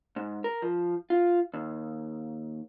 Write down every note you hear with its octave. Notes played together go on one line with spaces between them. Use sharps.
G#2
A#4
F3
F4
D#2